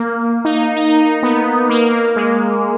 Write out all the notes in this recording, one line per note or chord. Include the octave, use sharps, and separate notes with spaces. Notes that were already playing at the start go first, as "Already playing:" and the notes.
Already playing: A#3
D#4
D#4
B3
A#3
G#3